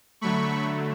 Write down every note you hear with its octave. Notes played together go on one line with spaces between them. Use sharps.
D3 F#3 A3 B5 C#6